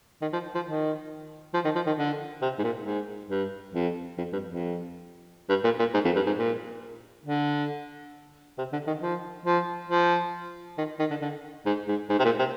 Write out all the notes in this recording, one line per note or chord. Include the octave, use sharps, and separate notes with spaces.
D#3
F3
F3
D#3
F3
D#3
F3
D#3
D3
C3
G#2
A#2
G#2
G2
F2
F2
G2
F2
G2
A#2
A#2
G#2
F2
G2
G#2
A#2
D3
C3
D3
D#3
F3
F3
F3
D#3
D#3
D3
D3
G#2
G#2
G#2
C3
A#2
C3